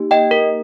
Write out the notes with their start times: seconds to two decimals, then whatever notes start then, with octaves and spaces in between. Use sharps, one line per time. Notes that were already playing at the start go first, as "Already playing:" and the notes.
Already playing: A#3 D#4 G4
0.11 D#5 G5
0.31 A#4